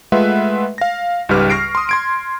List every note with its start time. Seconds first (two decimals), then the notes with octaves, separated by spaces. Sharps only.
0.12 G#3 A3 F4 B4 E5 F#5
0.78 F5 A#6
1.29 C#2 G#2 G3 G4 B4 F6
1.50 C#6 F6 A#6 C7 D7
1.75 C6 D#6
1.89 C6 G#6 D7